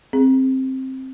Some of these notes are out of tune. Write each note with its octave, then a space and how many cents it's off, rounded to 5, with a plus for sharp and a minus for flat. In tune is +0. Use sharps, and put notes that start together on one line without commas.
C4 +10 G#4 +0